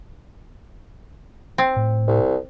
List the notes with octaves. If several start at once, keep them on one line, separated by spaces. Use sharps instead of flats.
C4
A2
C2